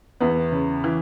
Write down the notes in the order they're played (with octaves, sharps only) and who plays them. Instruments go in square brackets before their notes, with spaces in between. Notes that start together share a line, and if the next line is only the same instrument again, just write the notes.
[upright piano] E2 B3
C#3
E3